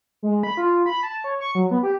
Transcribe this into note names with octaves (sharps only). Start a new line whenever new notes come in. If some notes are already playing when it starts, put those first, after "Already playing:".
G#3
B5
F4
B5
A5
C#5
C#6
F#3
B3
G4